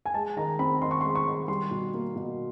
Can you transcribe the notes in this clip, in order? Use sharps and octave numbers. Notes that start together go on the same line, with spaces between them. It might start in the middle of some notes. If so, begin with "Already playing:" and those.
G#5
G#3 A5
D#3 A#5
C4 B5
D#3 C6
C#6
C6
G#3
C#6
D#3
G3 C6
B2
A#3
B2